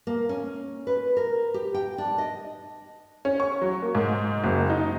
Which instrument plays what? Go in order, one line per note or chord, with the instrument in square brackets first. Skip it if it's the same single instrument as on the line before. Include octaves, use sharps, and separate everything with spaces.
[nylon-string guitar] A#3
C#4
B4
A#4
G4
G5
D4
D#5
[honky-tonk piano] C#4
C#6
F#3
A#3
G#2
F#1
D#4